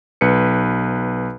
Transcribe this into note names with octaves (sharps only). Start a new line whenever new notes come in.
B1 B4 C#7